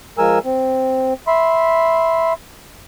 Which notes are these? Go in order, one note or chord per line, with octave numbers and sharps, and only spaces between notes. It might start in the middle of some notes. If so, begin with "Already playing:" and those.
F3 G#3 A#4 G#5 E6
C4
E5 B5 C6